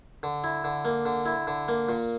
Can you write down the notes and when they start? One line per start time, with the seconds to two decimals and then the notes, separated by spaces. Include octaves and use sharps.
0.23 D3
0.44 E4
0.64 D3
0.85 A#3
1.06 D3
1.26 E4
1.47 D3
1.68 A#3
1.89 A#2